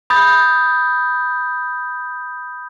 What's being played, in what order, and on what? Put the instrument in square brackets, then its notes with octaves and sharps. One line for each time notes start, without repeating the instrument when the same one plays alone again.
[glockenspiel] B5 D#6 G6 A6